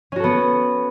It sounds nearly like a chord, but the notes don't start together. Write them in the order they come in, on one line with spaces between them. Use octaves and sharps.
C#4 F#4 A4 B3